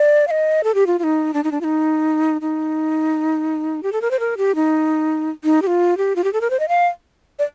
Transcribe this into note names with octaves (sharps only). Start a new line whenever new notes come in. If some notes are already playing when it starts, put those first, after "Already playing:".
Already playing: D5
F5
D#5
A4
G4
F4
F4
D#4
D4
D#4
D4
F4
D#4
D#4
G4
A4
A#4
C5
A#4
G4
D#4
D#4
G4
F4
G4
F4
G4
A4
A#4
C5
D#5
F5
D5